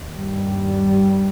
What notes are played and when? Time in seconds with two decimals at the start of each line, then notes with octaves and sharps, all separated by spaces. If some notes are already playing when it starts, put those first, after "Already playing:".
Already playing: D#2
0.11 G2 G3